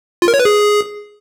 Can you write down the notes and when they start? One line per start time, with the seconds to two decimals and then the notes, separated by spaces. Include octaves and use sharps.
0.22 F4
0.28 A#4
0.34 C#5
0.40 B4
0.45 G#4